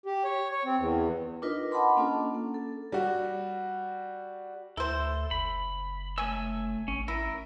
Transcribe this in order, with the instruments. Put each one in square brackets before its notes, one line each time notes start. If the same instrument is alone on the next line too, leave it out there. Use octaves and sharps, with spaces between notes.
[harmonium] G4
C#5
C#5
C4
E2
[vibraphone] D4 D#4 F4 A#4 B4 D#5
D#5 F#5 A5 B5 C6 D6
A#3 C#4 D4 F4 A4
A#3
A4
[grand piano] G3 F#4
[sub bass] D2 [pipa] E4 C5 [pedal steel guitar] A4
[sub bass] F#1 [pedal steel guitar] B5
[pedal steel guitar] A3 G#5 E6 [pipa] C#4
[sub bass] A1 [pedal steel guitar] C#4
[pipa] E4 [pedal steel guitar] A#4